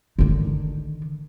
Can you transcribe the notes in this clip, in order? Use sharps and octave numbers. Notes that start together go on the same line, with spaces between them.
D3 D#3